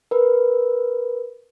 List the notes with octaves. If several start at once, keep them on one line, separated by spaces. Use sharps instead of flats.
A#4 B4